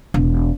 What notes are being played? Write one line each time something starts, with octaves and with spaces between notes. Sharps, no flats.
E1